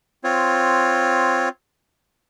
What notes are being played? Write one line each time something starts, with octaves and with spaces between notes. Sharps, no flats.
C4 F4 C#5